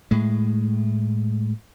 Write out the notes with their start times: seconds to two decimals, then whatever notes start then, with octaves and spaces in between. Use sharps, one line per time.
0.11 A2 G#3